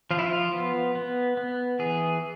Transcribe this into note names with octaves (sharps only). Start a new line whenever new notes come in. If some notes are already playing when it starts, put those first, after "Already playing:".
F3 F4
E4
F4
B3
B3
B3
E3 G#4